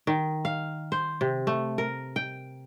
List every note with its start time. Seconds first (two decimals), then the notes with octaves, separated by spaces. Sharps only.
0.07 D#3
0.45 F5
0.92 C5
1.21 C3
1.47 A3
1.78 A#4
2.16 G5